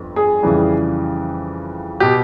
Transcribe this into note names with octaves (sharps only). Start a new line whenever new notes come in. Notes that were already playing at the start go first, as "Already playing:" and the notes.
Already playing: G1 F2
G#4
F2 C#3 E3 G3
B2 G4